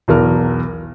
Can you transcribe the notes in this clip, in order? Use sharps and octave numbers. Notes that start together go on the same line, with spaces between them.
B1 E2 A#4 F6